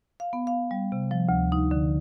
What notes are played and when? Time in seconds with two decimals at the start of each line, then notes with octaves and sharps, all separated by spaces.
0.20 F5
0.33 B3
0.47 F5
0.71 G3
0.92 C3
1.11 F3
1.29 D2
1.52 D#4
1.71 D3